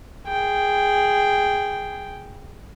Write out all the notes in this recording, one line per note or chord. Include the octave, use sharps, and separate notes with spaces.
G#4 G5